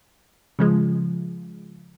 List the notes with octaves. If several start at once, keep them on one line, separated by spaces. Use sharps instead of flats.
C#3 F3 G#3